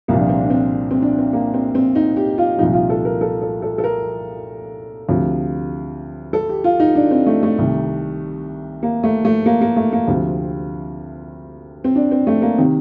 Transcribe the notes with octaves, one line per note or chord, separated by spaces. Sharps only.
C2 A#2 F3 A#3
D4
C4
D4
C4
C4
D4
C4
A#3
C4
C4
D#4
G4
F4
C2 A#2 F3 D#4
F4
A4
A#4
A4
A4
A4
A4
A#4
D2 C3 F3
A4
G4
F4
D#4
D4
C4
A3
A3
C2 C3 D#3
A#3
A3
A3
A#3
A#3
A3
A#3
D2 C3 F3 C4
C4
D4
C4
A3
A#3
C3 D#3 C4